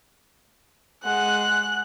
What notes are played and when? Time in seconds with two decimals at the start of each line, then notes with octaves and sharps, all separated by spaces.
1.04 G#3 F#5 F#6